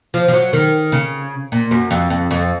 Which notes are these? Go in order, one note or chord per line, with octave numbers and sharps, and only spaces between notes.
F3
F3
F#3
D#3
C#3
A#2
F#2
F2
F2
F2